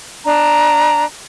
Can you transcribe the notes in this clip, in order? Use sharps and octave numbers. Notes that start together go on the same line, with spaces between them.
D4 A#5